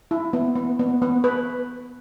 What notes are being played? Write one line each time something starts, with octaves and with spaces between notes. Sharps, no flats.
E4
B3
B3
B3
B3
B4